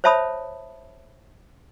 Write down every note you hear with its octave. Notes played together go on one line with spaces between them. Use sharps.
C5 C#5 E5 A5 B5 D#6